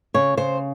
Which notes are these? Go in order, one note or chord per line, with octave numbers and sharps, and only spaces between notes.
C#3 C#5
C#3 C5